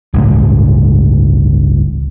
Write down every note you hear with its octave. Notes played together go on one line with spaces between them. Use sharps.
G1 C#2 A2 G#3